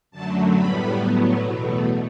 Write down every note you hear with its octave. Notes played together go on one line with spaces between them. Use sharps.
F#2 D3 F#3 A3 A5
A2 G3 B3 B5
A2 F#3 B3
E2 B2 A3